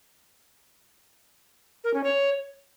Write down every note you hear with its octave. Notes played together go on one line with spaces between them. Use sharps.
A#4
C#4
C#5